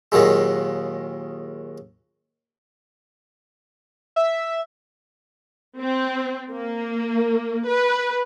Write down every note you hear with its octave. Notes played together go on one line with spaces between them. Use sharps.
D#2 A#2 D#3 F#3 G#3
E5
C4
A#3
B4